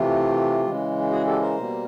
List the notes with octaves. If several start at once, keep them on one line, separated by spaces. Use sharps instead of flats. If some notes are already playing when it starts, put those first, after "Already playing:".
Already playing: C3 E3 A3 F4 G4
C#3 E3 G#3
F#4 G#4
G4 A4
A#4 C5
B2 G3 A#3